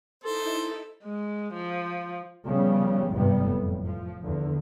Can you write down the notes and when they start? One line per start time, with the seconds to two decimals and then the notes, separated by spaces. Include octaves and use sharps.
0.24 D#4 E4 A4 C5
1.03 G#3
1.54 F3
2.47 C#3 F3 G3 B3
3.11 G#1 E2 G2 C3 G3 B3
3.41 F#1 F2 A2
3.84 F3
4.22 E2 D3